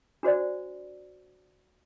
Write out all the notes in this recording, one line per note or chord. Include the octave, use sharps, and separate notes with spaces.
D4 F#4 C5 D5